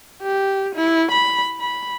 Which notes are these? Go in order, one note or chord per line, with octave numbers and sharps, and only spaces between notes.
G4
E4
B5
B5